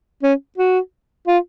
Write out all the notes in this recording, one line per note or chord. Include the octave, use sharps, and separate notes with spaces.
C#4
F#4
F4